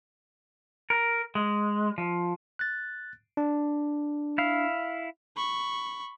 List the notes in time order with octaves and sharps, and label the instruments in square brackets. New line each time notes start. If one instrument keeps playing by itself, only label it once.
[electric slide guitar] A#4
G#3
F3
[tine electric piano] F#6 A6
D4
[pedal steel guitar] E4 F5
[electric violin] B5 C#6